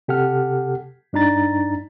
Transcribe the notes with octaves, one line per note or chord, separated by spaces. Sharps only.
C3 G4 A4 F#5 F6
G2 D4 D#4 A#5 A6